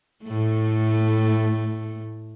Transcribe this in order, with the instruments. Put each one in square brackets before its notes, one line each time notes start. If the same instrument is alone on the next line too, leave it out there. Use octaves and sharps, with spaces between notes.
[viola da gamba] A2 A3